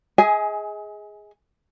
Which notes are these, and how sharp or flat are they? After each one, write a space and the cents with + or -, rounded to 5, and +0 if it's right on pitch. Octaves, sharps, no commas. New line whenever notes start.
G#4 +0 D#5 +35 G#5 +15